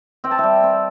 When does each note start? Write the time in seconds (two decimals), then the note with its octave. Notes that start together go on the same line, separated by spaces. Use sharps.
0.24 C4 G5
0.31 A5
0.39 G3 E5 G5
0.64 C4